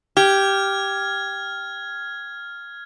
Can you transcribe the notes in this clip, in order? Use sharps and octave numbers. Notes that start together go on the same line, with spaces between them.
G4 F6 G#6